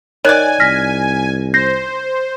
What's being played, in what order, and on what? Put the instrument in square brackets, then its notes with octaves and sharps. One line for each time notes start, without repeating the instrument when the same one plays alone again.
[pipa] D#3 D5 [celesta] C#5 F#6 [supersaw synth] G#5
[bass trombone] C2 [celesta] F6 A#6 B6
[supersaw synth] C5 [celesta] G6 A#6 C7